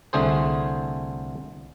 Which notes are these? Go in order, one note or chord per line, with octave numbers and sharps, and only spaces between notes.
C2 D3 A3 G#4 C5